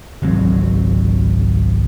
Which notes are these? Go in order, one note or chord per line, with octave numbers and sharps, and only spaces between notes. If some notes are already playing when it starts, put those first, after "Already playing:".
G#1 C#2 F#3 C4